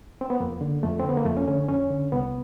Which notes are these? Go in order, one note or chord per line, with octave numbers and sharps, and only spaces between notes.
C4
B3
F2 A#3
D3
F2 A3
C4
D3
B3
A#3
F2 A3
C#4
D3 C#4
F2 C#4
D3
C2 B3